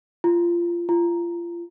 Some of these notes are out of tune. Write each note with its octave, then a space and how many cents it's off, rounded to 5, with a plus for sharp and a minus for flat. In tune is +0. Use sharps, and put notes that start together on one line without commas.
F4 -20
F4 -30